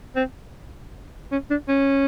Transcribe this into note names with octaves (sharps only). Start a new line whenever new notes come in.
C4
C#4
D4
C#4